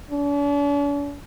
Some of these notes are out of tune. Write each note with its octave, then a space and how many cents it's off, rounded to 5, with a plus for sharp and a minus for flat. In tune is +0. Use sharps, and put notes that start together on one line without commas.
D4 -45